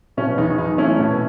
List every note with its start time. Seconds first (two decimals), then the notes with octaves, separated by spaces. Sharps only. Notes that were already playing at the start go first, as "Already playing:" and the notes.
0.17 B2 C#4
0.38 E2 D#4
0.58 E2 D#4
0.78 A3 C#4 E4
0.99 B2